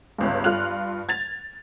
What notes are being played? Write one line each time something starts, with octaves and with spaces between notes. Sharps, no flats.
G1 C#2 G2
G2 F4 F6 F#6 F7
G#6 A6 F7